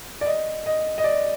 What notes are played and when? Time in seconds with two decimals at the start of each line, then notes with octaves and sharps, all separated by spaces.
0.21 D5
0.26 D#5
0.66 D#5
0.98 D#5
1.04 D5